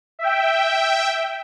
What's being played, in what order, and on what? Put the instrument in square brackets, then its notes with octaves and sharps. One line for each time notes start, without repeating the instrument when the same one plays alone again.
[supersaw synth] E5 G5